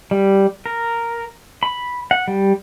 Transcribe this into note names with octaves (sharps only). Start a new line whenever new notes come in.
G3
A#4
B5
F#5
G3